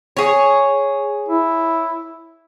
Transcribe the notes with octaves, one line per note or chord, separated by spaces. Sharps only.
G#4 C#5
E4